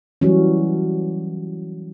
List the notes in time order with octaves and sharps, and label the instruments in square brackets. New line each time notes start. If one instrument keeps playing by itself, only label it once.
[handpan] E3 F#3 G3 C#4